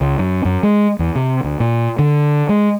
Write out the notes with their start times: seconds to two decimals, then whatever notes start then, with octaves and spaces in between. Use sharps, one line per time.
0.01 C#2
0.19 F#2
0.45 F#2
0.63 G#3
0.99 E2
1.15 C3
1.44 D2
1.60 A#2
1.99 D3
2.49 G#3